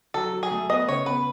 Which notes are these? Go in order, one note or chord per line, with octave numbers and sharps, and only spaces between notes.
F#3 A4
F#3
G#4
A3
B3 D#5
C#3 C#5
B3 B4